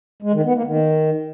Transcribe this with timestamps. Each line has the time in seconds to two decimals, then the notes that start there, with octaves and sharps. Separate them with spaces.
0.22 G#3
0.34 D#3
0.45 B3
0.56 A#3
0.67 D#3